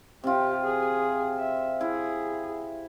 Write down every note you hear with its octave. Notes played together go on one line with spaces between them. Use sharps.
C3 F4 G4
G#4
E5
E4 G#4